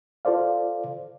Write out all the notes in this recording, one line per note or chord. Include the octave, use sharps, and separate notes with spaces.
F4 A4 C5 D5 F5